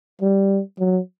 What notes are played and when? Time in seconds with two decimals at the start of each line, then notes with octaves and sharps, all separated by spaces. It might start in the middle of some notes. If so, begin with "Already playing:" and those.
0.21 G3
0.79 F#3